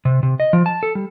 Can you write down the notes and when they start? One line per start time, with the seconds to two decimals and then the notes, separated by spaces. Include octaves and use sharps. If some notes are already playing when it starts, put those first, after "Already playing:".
0.05 C3
0.23 C3
0.40 D#5
0.53 F3
0.66 A5
0.83 A4
0.95 G3